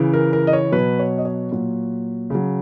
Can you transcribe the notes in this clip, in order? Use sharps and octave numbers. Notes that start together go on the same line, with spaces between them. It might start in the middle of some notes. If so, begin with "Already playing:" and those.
Already playing: C#3 E3
A#4
A#4
D#5
C#5
B2 F#3 B4
C#5
D#5
C#5
A#2 F#3
C#3 F#3